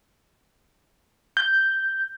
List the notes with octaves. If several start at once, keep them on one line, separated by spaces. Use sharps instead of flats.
G6